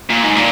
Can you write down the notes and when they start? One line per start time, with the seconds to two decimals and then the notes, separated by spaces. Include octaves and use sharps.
0.10 A#2
0.23 G#2
0.36 A#2